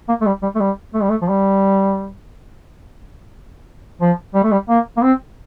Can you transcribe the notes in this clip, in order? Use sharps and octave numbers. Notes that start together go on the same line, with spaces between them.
A#3
A3
G3
G3
A3
G3
A3
G3
A3
F3
G3
F3
G3
A3
G3
A#3
A#3
C4